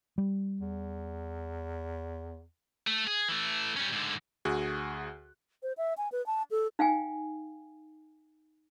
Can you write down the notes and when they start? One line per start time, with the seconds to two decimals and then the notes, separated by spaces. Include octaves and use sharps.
0.18 G3
0.61 E2
2.87 A3
3.07 G#4
3.29 E3 A3
3.77 G3 C#4
3.92 G#2 D3
4.45 D2 F#4 G#4 F#6
5.63 C5
5.77 E5
5.98 G#5
6.12 B4
6.26 A5
6.51 A4
6.79 D#4 F5 G5 G#5